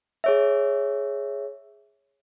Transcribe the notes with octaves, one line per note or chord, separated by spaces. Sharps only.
G#4 C#5 E5